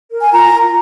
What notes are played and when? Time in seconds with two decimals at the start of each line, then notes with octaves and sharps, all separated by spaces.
0.12 A#4
0.21 G#5
0.32 F4 A#5
0.52 F4